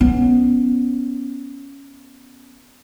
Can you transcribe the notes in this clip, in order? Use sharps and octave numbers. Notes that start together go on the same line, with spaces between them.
B3 C#4